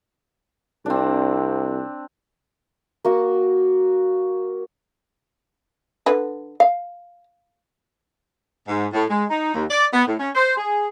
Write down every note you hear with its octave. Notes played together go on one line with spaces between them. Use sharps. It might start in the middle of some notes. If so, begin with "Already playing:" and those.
C2 C4 D4
A#3 F#4 F#5
D3 B4
F5
G#2
A2
G#3
D#4
D#2
D5
B3
A2
C#4
C5
G#4